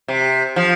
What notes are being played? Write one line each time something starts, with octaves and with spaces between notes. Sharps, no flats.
C3
F3